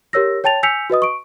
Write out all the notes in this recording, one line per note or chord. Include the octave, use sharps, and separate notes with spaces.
G4 A#4 C#5 E6 A#6
C#5 G5 A5 A6 F7
G#5 E6 G6 B6 C#7 F7
F#4 B4 D#5 D#6
C#6 D7